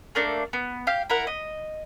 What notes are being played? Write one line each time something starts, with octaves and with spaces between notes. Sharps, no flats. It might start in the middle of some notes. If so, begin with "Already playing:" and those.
A3 A#3 D4
B3
G4 F5
E4 A#4 F#5
D#5